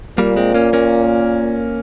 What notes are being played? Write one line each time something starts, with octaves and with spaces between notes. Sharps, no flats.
A#2 G3 A#3
G#3 C4
A#3 C#4
A#3 C#4